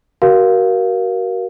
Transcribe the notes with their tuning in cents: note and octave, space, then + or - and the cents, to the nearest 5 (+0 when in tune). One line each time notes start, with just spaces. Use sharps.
F#4 +35 A#4 +20 F5 +0